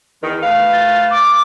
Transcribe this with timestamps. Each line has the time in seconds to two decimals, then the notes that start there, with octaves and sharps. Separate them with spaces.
0.22 E2 D#3
0.43 A3 B4 F5
0.73 A6
1.11 D6